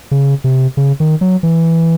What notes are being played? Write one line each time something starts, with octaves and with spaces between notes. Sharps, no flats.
C#3
C3
C#3
D#3
F#3
E3